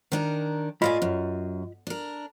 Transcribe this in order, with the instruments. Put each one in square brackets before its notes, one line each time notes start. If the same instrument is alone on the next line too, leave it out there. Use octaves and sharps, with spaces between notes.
[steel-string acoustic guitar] D#3 D4 A#4
[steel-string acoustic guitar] A2 D5 G#5 [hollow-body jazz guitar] F4 D#5 B5
[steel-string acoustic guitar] F#2
D4 A#4